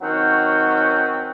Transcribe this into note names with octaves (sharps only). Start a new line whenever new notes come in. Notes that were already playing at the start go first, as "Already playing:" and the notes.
D#3 F#3 C4 C#4 F#5 G5